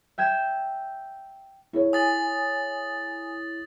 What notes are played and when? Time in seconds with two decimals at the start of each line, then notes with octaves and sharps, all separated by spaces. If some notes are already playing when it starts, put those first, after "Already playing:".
0.18 E5 G5 G#6 E7
1.73 E4 G#4 C#5
1.93 G#5 D#6 A6 F#7